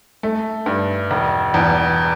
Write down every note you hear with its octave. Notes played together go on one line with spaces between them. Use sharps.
A3
G2
E1
E2